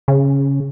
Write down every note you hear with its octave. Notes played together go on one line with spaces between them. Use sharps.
C#3